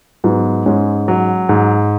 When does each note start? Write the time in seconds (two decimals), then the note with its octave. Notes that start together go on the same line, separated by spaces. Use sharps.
0.24 G#2 F#3 B3
0.66 G#2 G#3 C#4
1.08 F#3
1.49 G#2